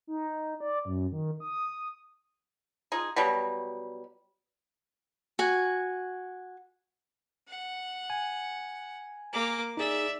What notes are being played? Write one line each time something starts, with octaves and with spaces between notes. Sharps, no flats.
D#4
D5
F#2
D#3
D#6
D#4 F4 G#4
B2 F#3 G3
F#4 G#5
F#5
G#5
A#3 D6
D#4 G#4 D5 E5